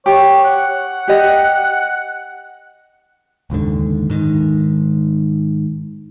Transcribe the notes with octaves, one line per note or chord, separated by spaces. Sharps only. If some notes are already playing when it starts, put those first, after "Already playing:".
G4 C#5
F#5
G4 D#5
F#1 D#2 G#2 D3
G#2 D#3